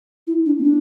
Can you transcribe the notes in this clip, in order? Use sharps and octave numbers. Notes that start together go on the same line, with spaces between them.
E4
D4
B3
D4